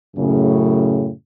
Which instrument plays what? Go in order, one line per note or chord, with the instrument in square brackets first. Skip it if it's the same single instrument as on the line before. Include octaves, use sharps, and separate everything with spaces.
[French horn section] F#2 A2 C#3